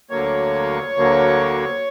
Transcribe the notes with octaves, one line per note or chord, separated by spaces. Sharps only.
D2 D3 F#3 A#3 C#5
D2 D3 F#3 A#3